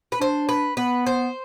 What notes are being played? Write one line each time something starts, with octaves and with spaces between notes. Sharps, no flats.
B4
D4 C5
B4
B3 B4
C5